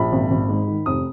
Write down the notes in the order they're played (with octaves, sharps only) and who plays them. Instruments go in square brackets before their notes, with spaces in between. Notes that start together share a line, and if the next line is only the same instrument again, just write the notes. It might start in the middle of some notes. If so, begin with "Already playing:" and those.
Already playing: [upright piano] A#1 B5
G#1
G#1
G#2
D#3
F1 D#6